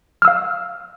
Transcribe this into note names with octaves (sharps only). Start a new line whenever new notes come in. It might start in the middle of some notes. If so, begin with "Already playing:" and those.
F5 E6 F6